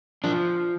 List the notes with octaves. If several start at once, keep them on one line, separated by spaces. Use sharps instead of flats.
F3 D4